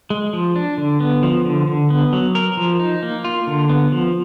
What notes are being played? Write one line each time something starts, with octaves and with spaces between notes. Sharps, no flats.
G#3
F3
D4
D3
B3
F3
D3
D3
B3
F#3
A#4
F3
D#4
A#3
F4
D3
B3
F3